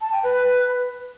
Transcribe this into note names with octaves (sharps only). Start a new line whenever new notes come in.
A5
G5
B4